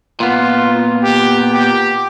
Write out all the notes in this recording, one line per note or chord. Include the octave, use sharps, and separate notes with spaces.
A#2 B3 F4
G4
G4